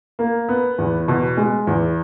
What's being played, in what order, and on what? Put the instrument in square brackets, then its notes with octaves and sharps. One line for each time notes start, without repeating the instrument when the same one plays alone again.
[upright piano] A#3
B3
E2
B2
G#3
E2